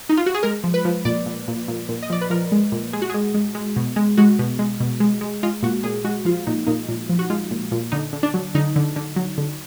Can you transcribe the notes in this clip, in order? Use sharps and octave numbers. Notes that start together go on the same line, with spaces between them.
D#4
F4
F#4
G#4
G#3 A#4
F3
B4
F3
A#2 D5
A#2
A#2
A#2
A#2
D#5
F3 D5
B4
F3 A#4
G#3
A#2
G#3 G#4
F#4
G#3 G#4
G#3
G#3
B2
G#3
G#3 F#4
B2
G#3
B2
G#3
G#3
G#3 F4
A#2 F#4
A#2 G#4
G#3 F#4
F3 F4
A#2 D#4
A#2 D#4
A#2
F3
F#4
G#3 F4
A#2
A#2
D3 D#4
D3
D4
F#3
D3 D#4
D3
D3
F#3
D3